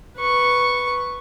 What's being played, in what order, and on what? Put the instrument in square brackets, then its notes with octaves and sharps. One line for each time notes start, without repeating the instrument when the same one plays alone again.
[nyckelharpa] B4 C#6